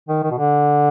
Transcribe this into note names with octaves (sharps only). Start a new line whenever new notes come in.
D#3
D#3
B2
D3